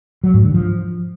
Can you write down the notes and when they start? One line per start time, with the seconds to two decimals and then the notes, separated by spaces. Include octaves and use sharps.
0.24 F#3
0.34 G#2
0.44 D3
0.54 F3